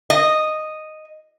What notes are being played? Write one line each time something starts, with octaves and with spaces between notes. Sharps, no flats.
D#5